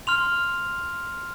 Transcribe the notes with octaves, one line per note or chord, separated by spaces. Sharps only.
C6 F6 F7